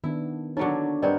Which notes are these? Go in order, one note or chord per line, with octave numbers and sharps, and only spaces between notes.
D#3 B3 D4 E4
D3 F#3 A#3 D#4 C#5 D5
G2 B3 C4 A#4 B4 D5 D#5